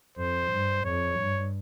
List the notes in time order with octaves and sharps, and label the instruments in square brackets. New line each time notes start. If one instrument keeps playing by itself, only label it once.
[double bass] F2 [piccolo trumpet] C5
[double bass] G2
[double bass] F2 [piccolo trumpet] C#5
[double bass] G2